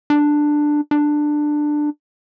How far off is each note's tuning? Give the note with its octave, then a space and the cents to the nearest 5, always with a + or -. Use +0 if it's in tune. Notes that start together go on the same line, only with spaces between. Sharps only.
D4 +10
D4 +15